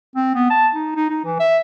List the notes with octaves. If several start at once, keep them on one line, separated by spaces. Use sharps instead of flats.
C4
B3
A5
D#4
D#4
D#4
E3
E5